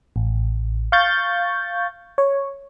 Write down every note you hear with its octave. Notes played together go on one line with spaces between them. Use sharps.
A1
F5 C#6 G6 A6
C#5